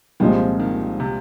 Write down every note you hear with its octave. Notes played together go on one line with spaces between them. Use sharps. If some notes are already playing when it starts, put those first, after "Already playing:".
C2 A#2 F3 G#3 C4
D#3
C3